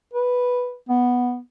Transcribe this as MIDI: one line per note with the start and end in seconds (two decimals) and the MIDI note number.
0.14 0.75 71
0.89 1.38 59